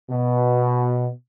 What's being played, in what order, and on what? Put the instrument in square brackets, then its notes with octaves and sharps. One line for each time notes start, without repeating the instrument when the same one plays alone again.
[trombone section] B2